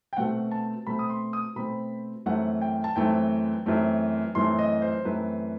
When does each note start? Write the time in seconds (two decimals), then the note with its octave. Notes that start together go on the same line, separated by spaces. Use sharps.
0.13 G5
0.17 B2 A3 C4 F#5
0.51 A5
0.87 B2 A3 C4 B5
0.99 D#6
1.10 C6
1.33 D#6
1.56 B2 A3 C4 B5
2.26 F#2 E3 A3 C4 F#5
2.62 G5
2.84 A5
2.96 F#2 E3 A3 C4 G5
3.66 F#2 E3 A3 C4
4.35 F#2 E3 A3 C4 C6
4.59 D#5
4.82 C5
5.05 F#2 E3 A3 C4 B4